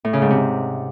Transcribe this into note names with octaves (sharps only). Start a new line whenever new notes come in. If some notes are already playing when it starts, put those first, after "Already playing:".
A2
C#3
G#2
C3